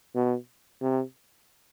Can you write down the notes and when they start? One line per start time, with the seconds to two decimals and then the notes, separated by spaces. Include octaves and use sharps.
0.15 B2
0.82 C3